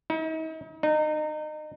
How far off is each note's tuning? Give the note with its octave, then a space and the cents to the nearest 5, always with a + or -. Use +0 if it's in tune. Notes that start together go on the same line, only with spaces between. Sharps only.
D#4 +40
D#4 -30